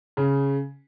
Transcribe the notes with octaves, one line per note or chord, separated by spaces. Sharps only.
C#3